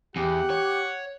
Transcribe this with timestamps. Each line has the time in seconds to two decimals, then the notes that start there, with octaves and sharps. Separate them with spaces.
0.16 E2 G4 F#5
0.50 C#5